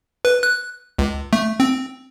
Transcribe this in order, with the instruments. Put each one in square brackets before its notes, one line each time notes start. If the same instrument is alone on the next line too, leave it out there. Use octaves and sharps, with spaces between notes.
[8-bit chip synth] B4
F#6
C#2
A3
C4